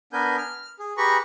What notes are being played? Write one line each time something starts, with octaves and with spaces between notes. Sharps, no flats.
B3 D4 A#4 B4 G#5 G6
F6
G#4
G4 G#4 B4 A#5 B5 C#6